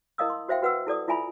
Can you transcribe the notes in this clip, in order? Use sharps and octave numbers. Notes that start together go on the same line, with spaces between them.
E4 A#4 D#5 F5 D#6 E6
C6
F#4 C5 E5 F5 G5
F#4 B4 F#5 G5 E6
E4 A4 D5 D#6
E4 F4 E5 G#5 A#5 B5